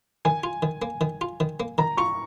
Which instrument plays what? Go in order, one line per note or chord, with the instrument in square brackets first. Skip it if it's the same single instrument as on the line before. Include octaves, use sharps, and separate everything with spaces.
[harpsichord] D#3 [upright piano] G#5
[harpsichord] F4
D#3
A#3
D#3
F4
D#3
A#3
[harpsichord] D#3 [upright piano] A#5
[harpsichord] F4 [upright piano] C#6